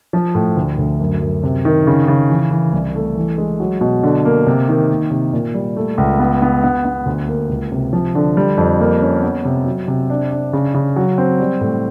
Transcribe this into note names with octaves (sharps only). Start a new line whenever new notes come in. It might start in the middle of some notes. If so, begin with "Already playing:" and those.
F3
A2
D2
D2
F#2
F#2
C3
D#3
C#3
C#3
E3
E3
C2
A3
E3
G#3
F#3
B2
D3
A#3
C3
D#3
A#3
C3
A#2
G3
A3
C#2
B3
B3
B3
B3
D2
A#3
C#2
C3
F3
D3
G3
F2
A#3
C#4
B3
C3
F#3
C3
D4
D4
C#3
C#3
F#3
C4
G3
A2